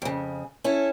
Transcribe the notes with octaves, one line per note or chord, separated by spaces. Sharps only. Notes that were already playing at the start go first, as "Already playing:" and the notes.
F2 C#3
C#4 E4 A4